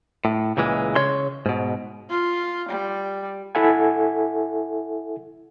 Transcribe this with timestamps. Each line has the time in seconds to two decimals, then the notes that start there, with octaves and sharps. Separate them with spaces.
0.25 A2
0.57 C#2 A#2 E3 G#3
0.95 C#3 C#5 C6
1.46 G#2 B2
2.10 F4
2.69 G3
3.55 E4 A4 E5 F#5 G#5